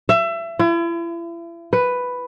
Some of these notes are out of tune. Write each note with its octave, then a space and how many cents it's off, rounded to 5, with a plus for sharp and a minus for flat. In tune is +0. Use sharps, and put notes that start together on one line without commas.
E5 +25
E4 +40
B4 +5